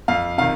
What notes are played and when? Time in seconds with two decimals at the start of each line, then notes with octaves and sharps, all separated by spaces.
0.08 F2 F5
0.38 C3 D#3 F5